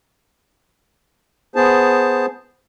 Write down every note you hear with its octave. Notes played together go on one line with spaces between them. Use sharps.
B3 G#4 C5 A5